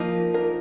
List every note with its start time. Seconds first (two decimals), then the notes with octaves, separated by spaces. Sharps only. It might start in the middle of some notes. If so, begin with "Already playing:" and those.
Already playing: F3 A#3 D#4
0.34 A#4